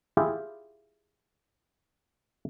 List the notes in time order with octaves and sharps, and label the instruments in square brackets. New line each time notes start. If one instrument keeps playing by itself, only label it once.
[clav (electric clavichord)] E4 F4 G4 G#4